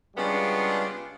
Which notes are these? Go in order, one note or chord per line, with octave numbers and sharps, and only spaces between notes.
C#3 G3 G#3 B3 D4 F4